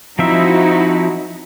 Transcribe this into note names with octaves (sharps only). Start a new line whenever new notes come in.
F3 C4 D#4 E4 F#4 E5